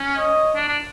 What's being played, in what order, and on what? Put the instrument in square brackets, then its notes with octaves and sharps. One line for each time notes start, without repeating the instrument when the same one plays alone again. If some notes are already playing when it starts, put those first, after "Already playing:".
Already playing: [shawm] C#4
[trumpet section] C#5 D#5
[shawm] D4
D4